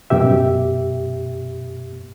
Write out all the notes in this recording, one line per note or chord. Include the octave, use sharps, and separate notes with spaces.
F#2 B2 G4 E5